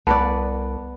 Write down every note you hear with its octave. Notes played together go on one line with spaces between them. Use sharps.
C2 B3 B4 D5 A5